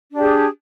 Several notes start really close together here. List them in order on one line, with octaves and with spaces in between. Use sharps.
D4 G4 G#4